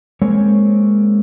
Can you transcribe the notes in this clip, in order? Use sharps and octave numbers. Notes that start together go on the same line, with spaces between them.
G#3 A#3 C4 C#5